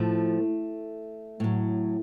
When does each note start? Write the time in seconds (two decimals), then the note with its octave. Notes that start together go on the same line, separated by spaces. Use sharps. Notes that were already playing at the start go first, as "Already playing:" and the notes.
Already playing: A2 F3 A3
1.40 A2 F#3